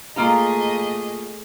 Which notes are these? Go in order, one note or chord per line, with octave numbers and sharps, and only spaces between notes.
A3 A#3 F4 G#4 D#5 A#5